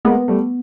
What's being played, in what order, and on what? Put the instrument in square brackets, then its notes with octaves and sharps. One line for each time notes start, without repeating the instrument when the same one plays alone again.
[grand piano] G#3 A#3 [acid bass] B3
[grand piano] G3 A3